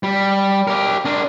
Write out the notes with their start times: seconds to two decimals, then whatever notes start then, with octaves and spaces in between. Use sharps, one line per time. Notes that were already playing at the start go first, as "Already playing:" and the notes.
0.03 G3
0.67 G4 A#4
1.05 D4 A#4